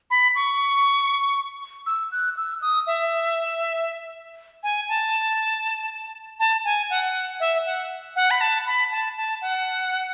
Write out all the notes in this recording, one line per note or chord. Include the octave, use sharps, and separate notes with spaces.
B5
C#6
E6
F#6
E6
D#6
E5
G#5
A5
A5
G#5
F#5
E5
F#5
F#5
B5
A5
B5
A5
A5
F#5